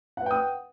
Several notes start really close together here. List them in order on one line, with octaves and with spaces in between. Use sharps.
F#5 B4 G5 D#6